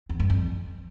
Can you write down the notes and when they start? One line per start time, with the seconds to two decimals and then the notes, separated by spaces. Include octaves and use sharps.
0.09 E2
0.20 G2
0.30 F2